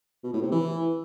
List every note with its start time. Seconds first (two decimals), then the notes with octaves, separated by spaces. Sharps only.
0.24 B2
0.33 A2
0.42 C3
0.52 E3